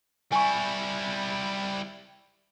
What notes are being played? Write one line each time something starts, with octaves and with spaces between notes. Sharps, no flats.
G3 E4 G#5 C#6